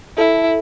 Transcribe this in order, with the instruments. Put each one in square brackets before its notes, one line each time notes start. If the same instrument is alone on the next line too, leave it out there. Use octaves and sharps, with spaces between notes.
[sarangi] E4 [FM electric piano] A4